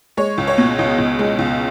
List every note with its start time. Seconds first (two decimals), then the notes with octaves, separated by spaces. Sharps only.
0.17 G#3 C#5
0.38 C#2
0.47 C#5
0.58 B2
0.78 C#2 D#5
0.98 C#2
1.19 G#3
1.39 C#2